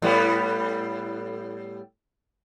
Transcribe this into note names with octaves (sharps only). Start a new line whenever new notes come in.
A2 G3 B3